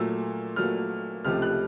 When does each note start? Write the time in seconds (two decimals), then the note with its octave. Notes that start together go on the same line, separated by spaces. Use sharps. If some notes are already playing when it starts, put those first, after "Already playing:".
Already playing: A#2 F#3 A3 E6
0.56 A#2 F#3 A3 F6
1.25 C#2 C3 F3 A3 F6
1.42 F#6